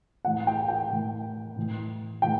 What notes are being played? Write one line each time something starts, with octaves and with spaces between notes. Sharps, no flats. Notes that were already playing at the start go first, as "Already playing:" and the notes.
A2 E3 F#5
G5
G5
A2 E3
A2 E3
A2 E3 G5